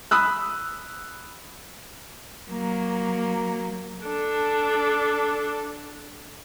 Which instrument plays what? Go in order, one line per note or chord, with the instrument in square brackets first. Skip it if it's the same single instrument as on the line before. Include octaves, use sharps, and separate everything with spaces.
[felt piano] B5 D#6 E6 F#6
[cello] F#3 A#3
[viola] D4 A4